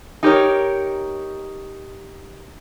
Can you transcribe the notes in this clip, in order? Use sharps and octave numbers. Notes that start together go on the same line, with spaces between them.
D#4 G4 A#4 C#5